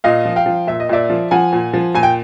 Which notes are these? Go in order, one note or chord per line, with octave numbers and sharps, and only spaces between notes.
A#2 D#5 F5
F3
F5 G5
F3
A#2 E5
D#5
A#2 D5 E5
F3
F3 F#5 G#5
A#2
F3
A#2 G#5
G5